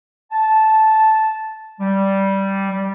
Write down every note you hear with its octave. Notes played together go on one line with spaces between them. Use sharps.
A5
G3
G3